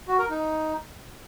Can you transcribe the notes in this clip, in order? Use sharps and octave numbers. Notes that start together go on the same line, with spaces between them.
F#4
A#4
D#4